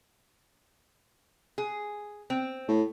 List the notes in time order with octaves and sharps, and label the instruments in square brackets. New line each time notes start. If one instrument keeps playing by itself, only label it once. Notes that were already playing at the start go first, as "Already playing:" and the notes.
[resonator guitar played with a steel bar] G#4
C4
[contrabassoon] A2